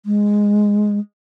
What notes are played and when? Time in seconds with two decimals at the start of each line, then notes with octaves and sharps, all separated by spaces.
0.06 G#3